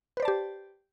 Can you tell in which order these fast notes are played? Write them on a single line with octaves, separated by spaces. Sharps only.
B4 C5 D5 A5 G4